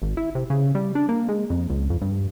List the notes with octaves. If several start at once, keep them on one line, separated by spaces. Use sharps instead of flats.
G#1
E4
C3
C#3
G3
D4
A#3
G#3
F2
C#2
F2
G2